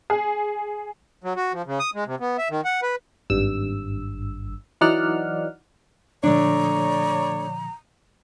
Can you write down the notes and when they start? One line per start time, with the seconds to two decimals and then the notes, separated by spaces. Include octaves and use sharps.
0.10 G#4
1.24 F#3
1.36 F#4
1.53 F3
1.66 C#3
1.79 D#6
1.95 G#3
2.07 C3
2.20 B3
2.38 E5
2.50 D#3
2.65 F#5
2.82 B4
3.30 G#1 G2 E6
4.81 E3 F#3 D#4 D5 F#5 F6
6.24 A#2 D3 F3 A3 D4 C#5 D5 A#5